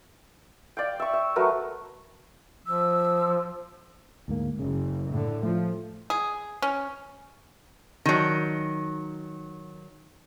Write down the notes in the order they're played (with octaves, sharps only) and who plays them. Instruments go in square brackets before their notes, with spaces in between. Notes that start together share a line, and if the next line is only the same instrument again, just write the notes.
[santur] D5 F5 G5
E5 C#6
E5
F#3 A3 A#4 B4
[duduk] F3 [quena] E6
[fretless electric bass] D2 G#2 A#3
[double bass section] F#1 [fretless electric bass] C#3
[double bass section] A2 D3
[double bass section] F3 [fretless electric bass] A3
[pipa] G#4
C#4
[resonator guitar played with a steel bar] D#3 F#3